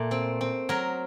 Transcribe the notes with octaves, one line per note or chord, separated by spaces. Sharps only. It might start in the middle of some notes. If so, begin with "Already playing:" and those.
Already playing: A#2 A3
C4
C4
F#3 A#4 A#5